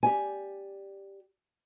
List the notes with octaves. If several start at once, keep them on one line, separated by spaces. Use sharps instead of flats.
G4 D5 G#5